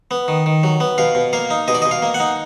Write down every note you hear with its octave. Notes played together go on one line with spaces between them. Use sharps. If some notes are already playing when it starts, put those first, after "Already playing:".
B3
D#3
D#3
F#3
B3
B2 F5
B2
A#3 F5
D#4
B2 D#5
D5
D#5
B2
F5
A#3
F#5
D#4